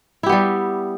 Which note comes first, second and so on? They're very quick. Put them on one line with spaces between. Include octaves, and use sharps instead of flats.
E4 G4 B3 G3